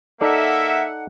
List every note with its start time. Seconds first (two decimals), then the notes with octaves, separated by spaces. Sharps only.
0.21 A#3 D#4 A4 D5 E5 F#5